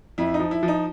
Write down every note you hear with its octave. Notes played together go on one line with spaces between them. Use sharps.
F2 E4
D#4
F3
E4
F3
D#4